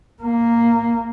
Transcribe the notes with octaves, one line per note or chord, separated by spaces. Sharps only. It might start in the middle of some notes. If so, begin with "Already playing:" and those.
A#3